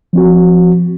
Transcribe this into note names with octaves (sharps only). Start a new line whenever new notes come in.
F3 C4 F#4